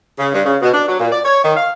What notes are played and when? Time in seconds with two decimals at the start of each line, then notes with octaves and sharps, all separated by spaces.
0.19 C#3
0.34 G2
0.46 C#3
0.62 B2
0.74 D4
0.89 F#3
1.00 A#2
1.12 D5
1.24 C#5
1.43 D#3
1.57 F5